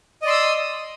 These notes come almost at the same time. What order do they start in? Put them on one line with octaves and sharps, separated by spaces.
D#5 D5 C6 E6 D#6